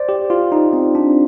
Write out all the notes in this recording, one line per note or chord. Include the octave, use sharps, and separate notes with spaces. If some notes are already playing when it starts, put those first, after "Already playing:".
Already playing: C5 D5
G4
F4
D#4
C4
D4